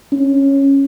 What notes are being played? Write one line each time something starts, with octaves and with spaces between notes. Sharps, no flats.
C#4